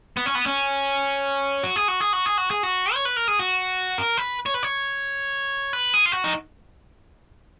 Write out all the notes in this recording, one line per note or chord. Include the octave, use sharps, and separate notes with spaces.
B3
C#4
B3
C#4
F#4
G#4
F#4
G#4
F#4
G#4
F#4
G#4
F#4
C#5
B4
A#4
G#4
F#4
A#4
B4
C#5
B4
C#5
B4
G#4
F4
F#4
D#4